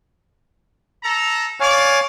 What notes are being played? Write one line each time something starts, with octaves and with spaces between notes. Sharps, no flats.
A4 A#5
C#5 D5 F5 G#5